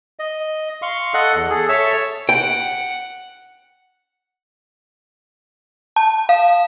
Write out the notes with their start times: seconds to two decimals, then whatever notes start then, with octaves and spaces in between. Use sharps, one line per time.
0.19 D#5
0.82 F5 C6 C#6
1.14 A4 D#5 F#5 F#6
1.35 E2
1.50 G#4 A4
1.69 A4 C#5 E5 A5
2.29 F#5 G5
5.96 A5
6.29 F5